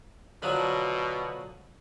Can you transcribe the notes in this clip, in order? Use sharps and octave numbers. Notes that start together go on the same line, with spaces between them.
B2 D3 F3 F#3